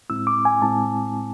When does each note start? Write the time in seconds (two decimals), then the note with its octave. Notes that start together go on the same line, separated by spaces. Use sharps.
0.10 A2 G#3 C4 E4 E6
0.27 D6
0.45 G#5
0.62 A2 G#3 C4 E4 A5